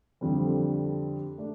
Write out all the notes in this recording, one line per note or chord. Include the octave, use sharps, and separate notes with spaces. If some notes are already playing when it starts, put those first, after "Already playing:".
F2 D3 G3 C4
A3 D4